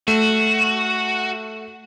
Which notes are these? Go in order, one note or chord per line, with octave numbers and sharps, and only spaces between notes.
A3 F#4